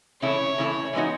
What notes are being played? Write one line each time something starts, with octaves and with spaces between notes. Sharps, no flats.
C#3 E3 A3 E4 C#5
C#3 E3 A3 E4
E3 G#3 B3 D#4 F#4